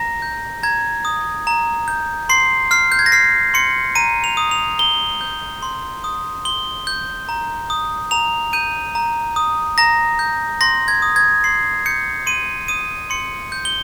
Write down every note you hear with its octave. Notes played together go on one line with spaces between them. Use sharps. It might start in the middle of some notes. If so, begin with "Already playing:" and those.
Already playing: A#5 A#6
G6
A#5 G#6
D#6
A#5
G6
C6 C7
F6 C7
G6
G#6
A#6
F6 C7
C6 C#7
A#5 D#7
F7
D#6
F7
A#5 G7
G6
C6
D#6
C6 G7
G6
A#5
D#6
A#5 F7
G6 D#7
A#5
D#6
A#5 A#6
G6
C6 A#6
G#6
D#6
G#6
C6 C7
G6 C#7
C6 D#7
D#6 D#7
C6 C#7
G6
G7